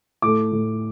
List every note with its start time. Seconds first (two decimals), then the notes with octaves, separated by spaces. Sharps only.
0.22 A2 A3 D6
0.52 A2 A3